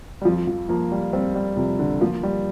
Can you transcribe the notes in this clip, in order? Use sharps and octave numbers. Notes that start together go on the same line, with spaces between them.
G3
F2 F3
F3
F3 A#3
G3
G3 C4
G3
F2 C3
D3
F3 A#3
G3